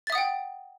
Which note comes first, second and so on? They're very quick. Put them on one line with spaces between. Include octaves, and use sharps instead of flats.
A6 E5 D#6 F#5 G5